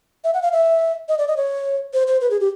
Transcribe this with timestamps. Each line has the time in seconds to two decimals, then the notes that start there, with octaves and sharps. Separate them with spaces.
0.24 E5
0.34 F#5
0.42 F5
0.53 E5
1.09 D#5
1.19 D5
1.28 D#5
1.37 C#5
1.94 C5
2.07 C5
2.21 B4
2.30 G#4
2.40 G4